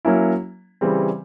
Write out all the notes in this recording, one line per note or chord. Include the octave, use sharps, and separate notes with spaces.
F#3 A#3 C#4 E4
C#3 E3 G3 C4